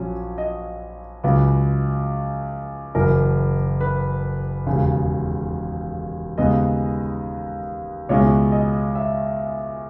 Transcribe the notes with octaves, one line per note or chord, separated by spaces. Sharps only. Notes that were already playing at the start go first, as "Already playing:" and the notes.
Already playing: A#1 A#2 F#3 C#4
D#5
C#2 C#3 F#3 B4
F#1 F#2 E3 A#4
B4
E1 D#2 C#3
D#2 C#3 G#3 B3 D#5
C#2 B2 G#3 C#4 E4 C#5
D#5
E5